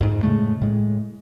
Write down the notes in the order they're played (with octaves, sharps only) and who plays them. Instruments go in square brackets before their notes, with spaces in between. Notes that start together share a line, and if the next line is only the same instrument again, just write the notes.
[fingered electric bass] F2 G#2
A2 C#3 G#3 A3
A2 G#3